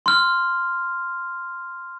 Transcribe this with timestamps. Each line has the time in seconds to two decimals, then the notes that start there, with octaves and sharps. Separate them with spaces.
0.06 C6 F6